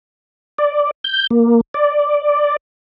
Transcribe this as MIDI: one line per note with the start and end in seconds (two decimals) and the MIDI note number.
0.58 0.91 74
1.04 1.27 91
1.31 1.61 58
1.74 2.56 74